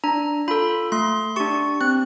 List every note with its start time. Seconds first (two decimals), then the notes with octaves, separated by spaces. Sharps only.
0.04 D4 A#5
0.48 F4 A4 B5
0.92 A3 C6
1.36 D4 G4 C#6
1.81 C4 F#6